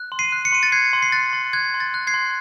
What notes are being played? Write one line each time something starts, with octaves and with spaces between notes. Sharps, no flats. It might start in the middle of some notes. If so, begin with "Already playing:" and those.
Already playing: F#6
C6
C7 D#7
F#6
C#7
C6 D#7
A6 C#7
F#6 G#6 C7
C6
C7
F#6 A6
C6
F#6 G#6
C6
A6
F#6
G#6 C7
C6